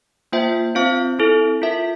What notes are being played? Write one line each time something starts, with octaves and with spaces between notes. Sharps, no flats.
A#3 F4 C5 E5 G5
C4 F4 C5 F5
C4 E4 A4
F4 A#4 E5